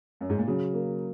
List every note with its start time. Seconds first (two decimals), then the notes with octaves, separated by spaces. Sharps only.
0.21 F#2
0.29 G#2
0.38 A#2
0.47 C#3 F#3
0.74 A#3